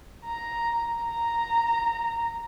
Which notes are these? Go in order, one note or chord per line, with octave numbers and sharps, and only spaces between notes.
A#5
A#5